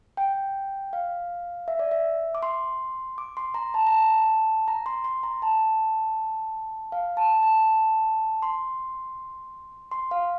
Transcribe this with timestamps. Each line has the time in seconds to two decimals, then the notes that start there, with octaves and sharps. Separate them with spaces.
0.17 G5
0.93 F5
1.68 E5
1.79 D5
1.91 E5
2.35 D6
2.43 C6
3.18 D6
3.37 C6
3.54 A#5
3.74 A5
3.87 A#5
3.92 A5
4.68 A#5
4.86 C6
5.04 C6
5.23 A#5
5.42 A5
6.92 F5
7.17 A5
7.43 A5
8.42 C6
9.91 C6
10.11 F5